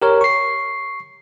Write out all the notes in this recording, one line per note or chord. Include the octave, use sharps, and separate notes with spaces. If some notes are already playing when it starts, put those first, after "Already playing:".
G4 A#4 C#5
C#6 C7